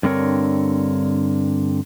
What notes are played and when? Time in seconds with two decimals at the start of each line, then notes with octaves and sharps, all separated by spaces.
0.03 G2 D3 C4 A#4 C#5